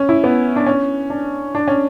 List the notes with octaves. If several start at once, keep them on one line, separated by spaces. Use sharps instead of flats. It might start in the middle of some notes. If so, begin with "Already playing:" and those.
Already playing: C#4
E4
B3
D4
C#4
D4
D4
C#4